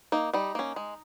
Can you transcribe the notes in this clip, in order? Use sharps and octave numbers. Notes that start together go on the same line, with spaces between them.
A#3 D#4
G3 D#4
A#3 C#4
G#3